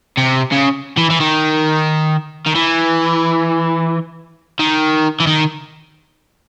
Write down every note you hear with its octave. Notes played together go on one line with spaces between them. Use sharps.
C3
C#3
E3
E3
D#3
D#3
E3
D#3
E3
D#3